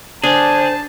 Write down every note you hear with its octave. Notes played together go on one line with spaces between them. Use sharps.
D3 D4 G#4 C5 A5